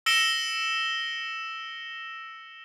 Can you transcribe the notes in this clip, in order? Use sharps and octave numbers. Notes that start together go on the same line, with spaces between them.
E6 A#6 C#7 D7 E7 G7